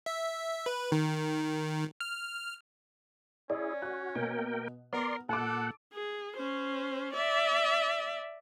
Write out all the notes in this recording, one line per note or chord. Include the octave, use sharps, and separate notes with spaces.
E5
B4
D#3
F6
C#4 E4 G#4 D5
F#4 F#6
B2 A#3 A#4 G5
B3 A#4 D5 C6
A#2 A4 F#5 A5 D6
G#4
C#4 C5
D5 E5